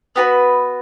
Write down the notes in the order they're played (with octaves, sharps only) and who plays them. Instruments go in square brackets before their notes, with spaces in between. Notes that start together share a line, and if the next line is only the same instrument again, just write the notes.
[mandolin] B3 F#4 B4